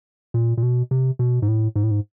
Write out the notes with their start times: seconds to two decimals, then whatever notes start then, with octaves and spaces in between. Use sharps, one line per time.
0.34 A#2
0.58 A#2
0.63 B2
0.91 C3
1.19 B2
1.42 G#2
1.48 A2
1.76 G#2
1.83 A2
1.91 G#2